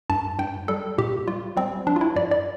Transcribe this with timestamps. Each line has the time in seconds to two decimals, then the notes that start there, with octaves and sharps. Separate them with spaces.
0.10 G2 A5
0.39 G2 G5
0.68 G3 A4
0.98 A#2 G4
1.27 G3 F4
1.57 G3 C4
1.87 F3 D4
1.96 F4
2.01 E4
2.16 G2 D5
2.31 D5